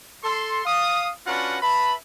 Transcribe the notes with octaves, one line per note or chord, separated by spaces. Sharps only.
A4 C6
F5 D#6
C#4 D4 F4 F#4 B4 F#5
B4 E5 A5 B5